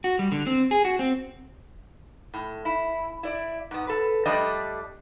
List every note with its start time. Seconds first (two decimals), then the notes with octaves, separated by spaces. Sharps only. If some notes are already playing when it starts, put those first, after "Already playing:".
0.04 F#4
0.19 G3
0.32 D3
0.47 C4
0.71 G#4
0.85 F#4
0.99 C4
2.34 A2
2.65 E4
3.23 E4 D5
3.71 G#2 B3
3.87 A4 B4
4.25 F3 G3 A3 D4 D5 D#5